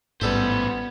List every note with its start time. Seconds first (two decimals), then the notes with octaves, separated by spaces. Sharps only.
0.21 A1 G#2 G3 B3 C#4 A4 B4 C5